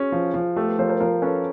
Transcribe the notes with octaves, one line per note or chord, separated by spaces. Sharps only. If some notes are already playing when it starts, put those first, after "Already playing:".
Already playing: C#4 F#4 G#4
F3
F3
A3 G4 A4
A4 B4
F3 A#4 C5
A#4 C5
F3 A#4 C5
C#4 A4 B4